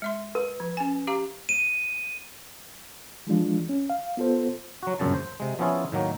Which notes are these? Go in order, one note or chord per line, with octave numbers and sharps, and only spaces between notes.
G#3 E5 C6
A#4 B4
F3
C#4 G#5
G4 F5 A#5
D#7
E3 F3 G#3 D4 F4
C#4
F5
B3 F4 A4 C5
F#3 F#4
G1 F#2 A#2 C#3 A5
C5
C3 G#3
F3 B3 C#4 E4 F4 G#4
A2 D#3 F#3 A#3